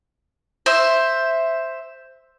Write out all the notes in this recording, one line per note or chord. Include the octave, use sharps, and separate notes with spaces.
C5 E5